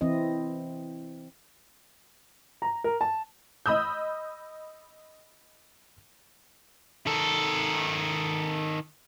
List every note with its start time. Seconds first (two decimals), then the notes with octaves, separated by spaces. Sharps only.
0.01 E3 C4 E4 D#5
2.62 A#5
2.84 A#4
3.01 A5
3.66 D#5 B5 D#6 E6 G6
7.07 D#3 A4